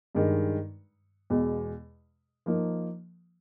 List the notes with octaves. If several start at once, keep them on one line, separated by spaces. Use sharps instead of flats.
G2 D#3 G#3
E2 B2 G#3
F3 A#3 D#4